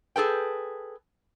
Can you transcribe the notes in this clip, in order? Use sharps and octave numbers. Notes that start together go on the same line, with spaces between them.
G#4 A4 B4 G5